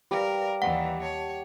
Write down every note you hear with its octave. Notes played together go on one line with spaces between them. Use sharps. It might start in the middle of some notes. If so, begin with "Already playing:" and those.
G3 A#4 B4 D5 F5
D#2 E3 F#5
C#5 A5